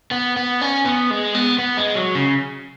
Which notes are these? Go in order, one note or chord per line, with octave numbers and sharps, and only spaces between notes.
B3
B3
C#4
B3
G#3
B3
B3
G#3
F#3
C#3